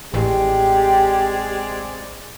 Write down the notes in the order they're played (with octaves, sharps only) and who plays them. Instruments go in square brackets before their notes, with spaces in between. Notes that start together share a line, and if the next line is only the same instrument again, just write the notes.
[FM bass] A1 [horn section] G#3 C4 D5 [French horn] G4